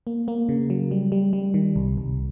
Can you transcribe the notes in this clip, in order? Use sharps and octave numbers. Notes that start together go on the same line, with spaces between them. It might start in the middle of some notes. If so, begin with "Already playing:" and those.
A#3
A#3
C#3
F#3
G3
G3
G3
D#3
C2
C2